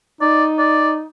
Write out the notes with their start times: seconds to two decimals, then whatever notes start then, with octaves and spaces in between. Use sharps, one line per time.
0.21 D#4 D5
0.58 D5